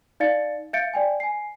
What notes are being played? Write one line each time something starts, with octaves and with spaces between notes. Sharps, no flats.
D#4 D5 F5 A6 C#7
E5 F5 G6 A6 C#7 D7
D5 G5 G#5
G#5 C7